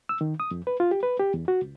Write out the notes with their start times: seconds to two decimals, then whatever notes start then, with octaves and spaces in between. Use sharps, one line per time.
0.09 E6
0.21 D#3
0.40 D#6
0.51 F2
0.67 B4
0.80 F4
0.91 G4
1.03 B4
1.20 G4
1.34 E2
1.48 F#4
1.62 C#2